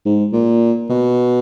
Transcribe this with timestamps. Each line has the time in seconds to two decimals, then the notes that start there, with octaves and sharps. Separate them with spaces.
0.05 G#2
0.33 A#2
0.90 B2